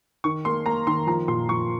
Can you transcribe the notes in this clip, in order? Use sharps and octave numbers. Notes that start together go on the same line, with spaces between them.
D#3 C#6
A#3 C6
A#3 A#5
D#3 C6
F3 A#5
A#2 C6
F3 C#6